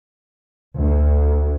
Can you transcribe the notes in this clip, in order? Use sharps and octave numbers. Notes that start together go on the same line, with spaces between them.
D2